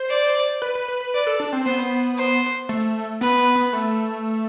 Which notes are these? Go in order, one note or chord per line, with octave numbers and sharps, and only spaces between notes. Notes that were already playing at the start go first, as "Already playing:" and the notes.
Already playing: C5
D5
B4
B4
B4
B4
B4 D5
A4
D4
C4
B3 C5
C5
A3
B3 B4
B3
B3
A3